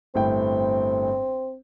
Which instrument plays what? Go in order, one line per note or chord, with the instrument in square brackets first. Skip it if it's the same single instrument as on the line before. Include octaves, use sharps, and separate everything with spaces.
[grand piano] G1 A2 G5 [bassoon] C4